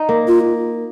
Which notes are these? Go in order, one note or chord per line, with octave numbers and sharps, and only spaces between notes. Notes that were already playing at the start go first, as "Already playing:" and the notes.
Already playing: D#4
A#3
F4